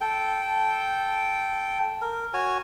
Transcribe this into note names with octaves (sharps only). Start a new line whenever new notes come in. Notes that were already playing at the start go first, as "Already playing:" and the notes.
A4 G5
A#4
F#4 C#5 G#5